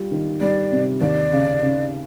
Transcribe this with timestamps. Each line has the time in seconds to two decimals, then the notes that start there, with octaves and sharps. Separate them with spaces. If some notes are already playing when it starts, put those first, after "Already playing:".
Already playing: G3 F4
0.11 D#3
0.41 G3 D5
0.72 C3
1.01 D#2 D5
1.32 C#3
1.62 C#3